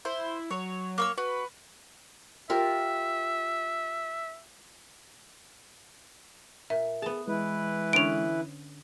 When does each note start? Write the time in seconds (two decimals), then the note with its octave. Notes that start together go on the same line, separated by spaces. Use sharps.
0.05 E4 C5
0.51 F#3 C#5
0.98 A#3 C#5 E6
1.18 F#4 B4
2.50 F4 G4 A#4 E5
6.70 A#2 E5
7.02 B3 G#4 A5
7.28 E3 G#3 E4 B4
7.93 D3 B3 C#4 D7 F7